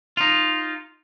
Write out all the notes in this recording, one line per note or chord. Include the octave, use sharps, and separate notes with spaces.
D#4 F4